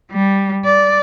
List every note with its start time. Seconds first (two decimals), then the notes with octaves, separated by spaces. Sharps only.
0.12 G3
0.66 D5